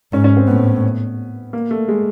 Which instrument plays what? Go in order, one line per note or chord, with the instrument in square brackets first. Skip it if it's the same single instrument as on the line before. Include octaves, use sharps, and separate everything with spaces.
[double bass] G#2 [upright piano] C#4
[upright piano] C#4
C4
[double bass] A2 [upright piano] B3
[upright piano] A#3
A3
G#3